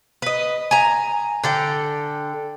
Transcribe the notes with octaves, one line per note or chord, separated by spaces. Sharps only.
B4 D#5
G#5 A#5
D3 A4 G5